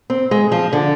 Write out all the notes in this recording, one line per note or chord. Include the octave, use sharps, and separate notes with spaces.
C4
G#3
F3
D3